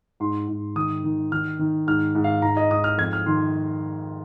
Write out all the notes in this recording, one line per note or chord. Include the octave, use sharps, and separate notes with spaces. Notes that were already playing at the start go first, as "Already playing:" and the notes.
G#2 C6
G#2
D#3 D#6
D#3
D#3 F6
D#3
G#2 F6
G#2
F5
G#2 A#5
D#5
G#2 D#6
F6
F2 G#6
F6
D#3 C6